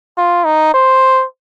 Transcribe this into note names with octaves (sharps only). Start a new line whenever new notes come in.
F4
D#4
C5